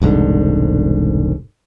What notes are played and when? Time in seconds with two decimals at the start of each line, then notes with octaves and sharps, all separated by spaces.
0.02 E1 C2 G#2 D3